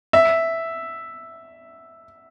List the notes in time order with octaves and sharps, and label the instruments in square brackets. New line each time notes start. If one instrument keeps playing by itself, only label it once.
[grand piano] E5